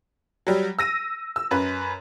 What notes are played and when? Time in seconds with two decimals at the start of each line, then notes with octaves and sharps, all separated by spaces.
0.47 F#3 G3
0.79 E6 A#6 D#7
1.36 E6
1.51 F#2 B4